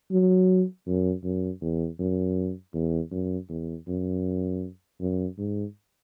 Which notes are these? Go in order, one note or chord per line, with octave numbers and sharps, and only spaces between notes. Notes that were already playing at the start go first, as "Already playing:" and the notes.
F#3
F#2
F#2
E2
F#2
E2
F#2
E2
F#2
F#2
G#2